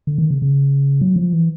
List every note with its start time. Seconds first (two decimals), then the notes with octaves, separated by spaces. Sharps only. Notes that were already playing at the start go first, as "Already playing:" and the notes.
0.07 D3
0.18 D#3
0.31 C#3
0.42 C#3
1.01 F#3
1.16 F3
1.33 E3